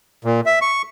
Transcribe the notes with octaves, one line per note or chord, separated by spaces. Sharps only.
A#2
E5
C#6